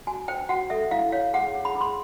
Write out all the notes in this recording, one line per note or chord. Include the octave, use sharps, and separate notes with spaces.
F#4 G#5
C5 G5
F#4 F#5
A4 E5
E4 F5
C#5 F5
G#4 F#5
G#4
B5
G#4
C6